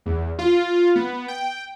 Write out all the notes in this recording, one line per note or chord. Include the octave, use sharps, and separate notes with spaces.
E2
F4
B3
G5